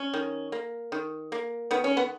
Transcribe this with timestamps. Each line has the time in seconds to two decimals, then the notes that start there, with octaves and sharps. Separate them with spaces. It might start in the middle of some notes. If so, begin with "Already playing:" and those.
Already playing: C#4
0.14 D#3
0.52 A#3
0.92 D#3
1.32 A#3
1.71 D#3 B3
1.84 C#4
1.97 B3